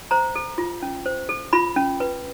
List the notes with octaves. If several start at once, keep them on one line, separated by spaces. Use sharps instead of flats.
C5 A#5
A4
F4
C#4
C5
A4
F4 B5
C#4
B4